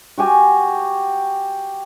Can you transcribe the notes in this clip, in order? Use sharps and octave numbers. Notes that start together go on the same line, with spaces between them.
F#4 G4 G#5